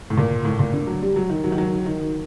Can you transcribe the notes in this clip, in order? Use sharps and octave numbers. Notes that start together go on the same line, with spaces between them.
A2
A#2
A2
A#2
D3
F#3
G3
F#3
D#3
F#3
D#3
F#3
D#3